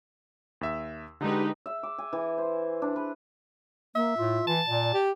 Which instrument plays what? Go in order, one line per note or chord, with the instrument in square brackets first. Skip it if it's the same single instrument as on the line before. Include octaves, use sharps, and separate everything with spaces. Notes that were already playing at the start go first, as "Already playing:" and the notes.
[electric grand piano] D#2 E5 E6
[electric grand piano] D3 G#3 [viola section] D#4 G4 B4
[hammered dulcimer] E5
D6
G#5
E3
C5
D4
B4
[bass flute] A#3 [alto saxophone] E5
[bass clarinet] A2 [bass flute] F4
[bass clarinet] E3 [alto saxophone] A5
[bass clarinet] A#2 [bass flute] D5
[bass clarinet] G4